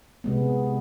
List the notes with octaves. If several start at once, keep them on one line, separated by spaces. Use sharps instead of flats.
C3 G#3 B3